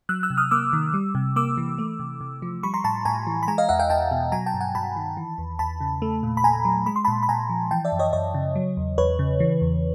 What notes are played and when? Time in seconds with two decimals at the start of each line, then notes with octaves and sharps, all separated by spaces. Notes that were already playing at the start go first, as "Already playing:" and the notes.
0.09 F#3 E6 F#6
0.23 E6 F#6
0.30 C3
0.37 D#6 F6
0.51 A#3 D6 E6
0.73 D#3
0.94 G3
1.15 C3
1.36 A#3 D6 E6
1.57 E3
1.78 A3
1.99 C3
2.21 C3
2.42 F3
2.63 G3 B5 C#6
2.74 A#5 C6
2.84 A2 A5 B5
3.05 A2 G#5 A#5
3.27 E3
3.43 B5
3.48 G#3 G#5 A#5
3.58 D#5 F5
3.69 E2 E5 F#5
3.79 F5 G5
3.90 E2 G5 A5
4.11 B2
4.32 F#3 G#5 A#5
4.46 G5 A5
4.54 G2
4.61 F#5 G#5
4.75 G2 A5 B5
4.96 D#3
5.17 E3
5.38 E2
5.59 E2 A5 B5
5.81 C#3
6.02 A3
6.23 A#2
6.37 B5
6.44 A#2 G#5 A#5
6.65 F#3
6.86 G#3 B5
6.96 C6
7.05 A#2 A5 B5
7.23 B5
7.29 A#2 G#5 A#5
7.50 F3
7.71 E3 G5 A5
7.85 D5 E5
7.92 F#2
7.99 C#5 D#5
8.13 F#2 C#5 D#5
8.34 C#3
8.55 F#3
8.77 E2
8.98 E2 B4 C#5
9.19 C#3
9.40 E3
9.61 E2